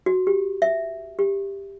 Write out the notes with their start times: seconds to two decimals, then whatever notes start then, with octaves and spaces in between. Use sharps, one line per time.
0.06 F#4
0.27 G4
0.62 E5
1.19 G4